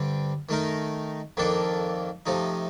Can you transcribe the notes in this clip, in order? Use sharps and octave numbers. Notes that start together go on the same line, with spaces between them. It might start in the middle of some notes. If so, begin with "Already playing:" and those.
Already playing: G2 D3 G3 C4
D#3 A3 D#4 A#4
F2 D#3 A#3 D4 A4
C3 F3 A3 D#4